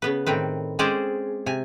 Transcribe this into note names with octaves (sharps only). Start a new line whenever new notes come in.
C#3 B3 B4
A2 D#3 C4 B4
G#3 C4 C#4 G#4 C5 D5
C3 G#5